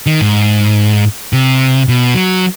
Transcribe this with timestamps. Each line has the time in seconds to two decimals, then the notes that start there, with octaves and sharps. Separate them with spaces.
0.06 D#3
0.21 G#2
1.33 C3
1.88 B2
2.15 F#3